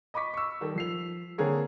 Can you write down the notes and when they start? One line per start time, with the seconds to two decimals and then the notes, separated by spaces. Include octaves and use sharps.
0.14 D#5 B5 C#6 D6 B6
0.34 C#6 E6
0.61 D#3 G3 A4
0.76 F3 C7 F7
1.38 D3 A#3 C4 G#4 A#4 C#5